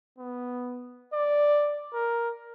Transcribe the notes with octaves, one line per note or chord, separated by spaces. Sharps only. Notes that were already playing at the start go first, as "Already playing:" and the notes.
B3
D5
A#4